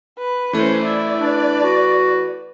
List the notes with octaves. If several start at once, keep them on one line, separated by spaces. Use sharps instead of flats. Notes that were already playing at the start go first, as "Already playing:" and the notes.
B4
E3 A3 C#4 C5
E4 D5
D4 B4
F#4